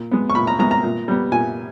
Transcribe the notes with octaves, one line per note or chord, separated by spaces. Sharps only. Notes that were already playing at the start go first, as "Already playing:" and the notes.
Already playing: A#2
G#3 B3
C#6
A#2 B5
A#5
G#3 B3 A#5
A#5
A#2
G3 B3
A#2 G#5